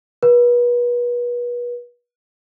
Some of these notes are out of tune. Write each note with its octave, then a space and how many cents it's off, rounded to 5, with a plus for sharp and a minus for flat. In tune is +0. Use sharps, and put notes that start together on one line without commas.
B4 -35